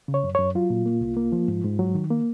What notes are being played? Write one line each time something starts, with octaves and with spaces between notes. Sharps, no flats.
C#3
C#5
F#2
F#2 C#5
F#3 F4
A#2
A#3
C2
A#3
F3
G#2
G#2
F#3
D#3
A#3